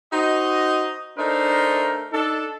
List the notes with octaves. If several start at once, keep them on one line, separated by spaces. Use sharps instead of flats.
D#4 F#4 C5 D#5
A3 D4 D#4 A#4 C5
D4 D#4 A4